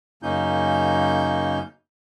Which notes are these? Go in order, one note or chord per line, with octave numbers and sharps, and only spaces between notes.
F#2 C#3 A#3 C#4 D#4 G6